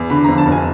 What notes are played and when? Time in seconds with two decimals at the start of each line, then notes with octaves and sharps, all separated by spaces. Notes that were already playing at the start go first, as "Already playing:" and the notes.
Already playing: E2
0.10 D3 B5
0.24 F2 A#5
0.38 A5
0.47 F1
0.52 G#5